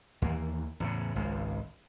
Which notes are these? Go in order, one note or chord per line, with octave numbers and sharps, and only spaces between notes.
D#2 E3 A#3
E2 A2 C#3
G#1 C#2